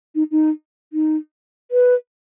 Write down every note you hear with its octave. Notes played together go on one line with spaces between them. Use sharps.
D#4
D#4
D#4
B4